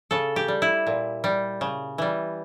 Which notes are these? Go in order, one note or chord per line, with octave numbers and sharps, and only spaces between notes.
C#3 A4
G4
G3
E4
A#2
G3
C#3
E3 G3